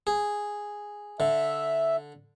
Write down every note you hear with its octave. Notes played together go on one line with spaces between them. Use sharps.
G#4
D3 E5